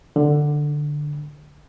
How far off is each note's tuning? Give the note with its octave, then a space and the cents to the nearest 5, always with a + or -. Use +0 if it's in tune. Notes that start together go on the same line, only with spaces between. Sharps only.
D3 +10